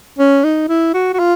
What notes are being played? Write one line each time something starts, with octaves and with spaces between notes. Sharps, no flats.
C#4
D#4
E4
F#4
F#4
F4